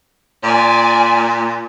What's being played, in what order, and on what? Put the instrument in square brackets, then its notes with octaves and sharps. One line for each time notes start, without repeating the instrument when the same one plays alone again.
[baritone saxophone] A#2 [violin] D5 G#5